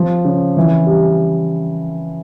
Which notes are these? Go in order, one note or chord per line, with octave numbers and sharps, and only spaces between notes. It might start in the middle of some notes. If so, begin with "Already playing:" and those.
Already playing: F3
C#3
E3
G3